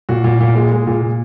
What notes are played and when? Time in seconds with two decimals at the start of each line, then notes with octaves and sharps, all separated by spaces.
0.09 A#2 F#4
0.24 A#2
0.40 A#2
0.55 G#3
0.71 G#3
0.87 A#2